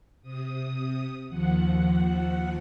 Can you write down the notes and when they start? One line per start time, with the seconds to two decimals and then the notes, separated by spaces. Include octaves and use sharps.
0.22 C3 D#6
1.29 D#2 F3 F#5